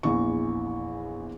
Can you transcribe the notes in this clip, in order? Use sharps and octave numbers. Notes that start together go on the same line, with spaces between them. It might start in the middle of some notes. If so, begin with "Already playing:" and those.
A#1 E2 E3 C#6